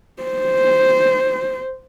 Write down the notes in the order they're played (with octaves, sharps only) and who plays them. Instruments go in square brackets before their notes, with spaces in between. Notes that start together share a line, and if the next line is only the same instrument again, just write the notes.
[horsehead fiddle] C5